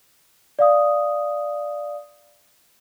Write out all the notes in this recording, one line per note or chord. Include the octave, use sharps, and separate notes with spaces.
D5 F5 D#6